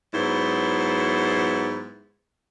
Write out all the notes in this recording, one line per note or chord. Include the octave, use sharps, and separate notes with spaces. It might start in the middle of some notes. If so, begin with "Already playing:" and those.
G#2 F#3 B3 E4 C5